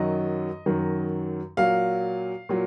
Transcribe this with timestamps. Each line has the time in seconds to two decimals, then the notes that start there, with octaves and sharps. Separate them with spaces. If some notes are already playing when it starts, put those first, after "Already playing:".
Already playing: F#2 D#3 F#3 D#5
0.66 F#2 D#3 F#3
1.57 A#2 F#3 F5
2.49 A#2 F#3